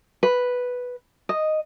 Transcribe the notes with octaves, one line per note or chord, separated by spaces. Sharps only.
B4
D#5